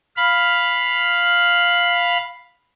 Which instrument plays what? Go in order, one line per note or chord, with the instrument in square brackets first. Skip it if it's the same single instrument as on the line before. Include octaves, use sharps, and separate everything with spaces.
[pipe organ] F5 B5